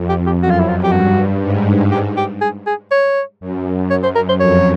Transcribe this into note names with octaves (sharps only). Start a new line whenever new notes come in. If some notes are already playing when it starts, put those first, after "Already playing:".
Already playing: F2
G4
G4
F#2 F#4
F4
E4
F4
G4
G2 F#4
G#2
G4
G4
G#4
G#4
C#5
F#2
F#2 C#5
C5
A#4
C5
F2 C#5